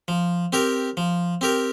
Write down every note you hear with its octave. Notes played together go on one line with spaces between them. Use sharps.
F3
C4 G4 A#4
F3
C4 G4 A#4